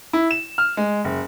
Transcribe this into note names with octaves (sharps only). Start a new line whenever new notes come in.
E4
E7
F6
G#3
F#1